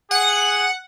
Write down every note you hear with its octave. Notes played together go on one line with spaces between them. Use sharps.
G#4 F#5